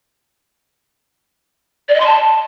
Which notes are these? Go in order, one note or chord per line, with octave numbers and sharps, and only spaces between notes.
D5
D#5
C6
A5